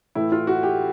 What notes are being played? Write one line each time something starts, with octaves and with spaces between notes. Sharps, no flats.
A2 E3 A3 E4
F4
F#4
G4